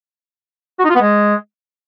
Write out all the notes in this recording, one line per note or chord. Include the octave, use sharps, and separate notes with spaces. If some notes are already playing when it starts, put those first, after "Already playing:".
F#4
D#4
F4
B3
G#3